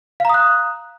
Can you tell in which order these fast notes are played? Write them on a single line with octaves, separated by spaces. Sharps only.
F5 A#5 D#6 F#6